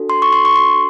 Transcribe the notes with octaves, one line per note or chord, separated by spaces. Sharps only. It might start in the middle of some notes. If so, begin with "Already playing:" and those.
Already playing: D4 F#4 A4
C6
C#6
C6
C#6
C6